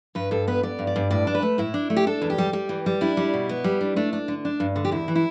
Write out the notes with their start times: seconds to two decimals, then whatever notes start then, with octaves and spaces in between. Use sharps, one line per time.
0.15 G2 B4
0.31 G2 A4
0.47 B3 B4
0.63 B3 D5
0.79 G2
0.87 D5
0.96 G2
1.11 A2 D5
1.27 D4
1.35 B4
1.42 A3
1.58 A2 E4
1.74 D4
1.90 A3
1.96 G4
2.07 D4 A4
2.22 E2
2.30 G4
2.38 G3
2.53 G3
2.69 E3
2.86 G3
3.01 D4 E4
3.17 G3
3.34 B2
3.49 B3
3.64 G3
3.81 D4
3.96 A3 D4
4.13 D4
4.28 D3
4.45 D4
4.60 G2
4.76 D3
4.85 G4
4.91 E2 E4
5.08 E3
5.15 E4